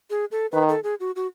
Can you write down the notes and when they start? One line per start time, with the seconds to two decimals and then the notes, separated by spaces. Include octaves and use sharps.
0.10 G#4
0.31 A4
0.52 D#3 B4
0.69 A4
0.84 G#4
1.00 F#4
1.16 F#4